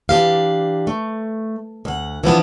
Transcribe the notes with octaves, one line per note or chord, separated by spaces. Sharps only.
E3 D4 G4 F5
A3
D2 F#5
E3 F3 B3 D4